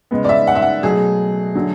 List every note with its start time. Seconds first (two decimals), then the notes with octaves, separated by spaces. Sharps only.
0.11 C#3 G#3 B3
0.24 D5
0.29 E5
0.47 F#5
0.55 E5
0.62 F#5
0.83 B2 F#3 A3 G#4
1.55 D3 F#3 A3